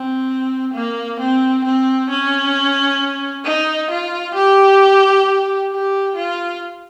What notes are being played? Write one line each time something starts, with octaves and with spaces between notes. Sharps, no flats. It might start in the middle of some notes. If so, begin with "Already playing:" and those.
Already playing: C4
A#3
C4
C4
C#4
D#4
F4
G4
G4
F4